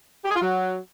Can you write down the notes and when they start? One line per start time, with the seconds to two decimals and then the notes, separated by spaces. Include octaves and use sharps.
0.24 G4
0.30 G#4
0.36 F4
0.42 F#3